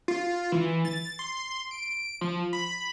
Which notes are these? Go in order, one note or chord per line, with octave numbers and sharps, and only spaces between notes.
F4
E3
A6
C6
D7
F3
B5